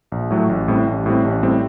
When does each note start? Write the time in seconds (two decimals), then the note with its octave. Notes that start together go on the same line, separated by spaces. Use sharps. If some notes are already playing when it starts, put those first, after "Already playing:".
0.12 A#1
0.30 A2 F#3 A3
0.49 A1
0.68 A2 G3 C4
0.87 A1
1.06 A2 G3 C4
1.25 A1
1.43 A2 G3 C4